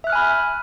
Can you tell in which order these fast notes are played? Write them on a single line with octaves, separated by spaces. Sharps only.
E5 F#6 F6 G#5 B5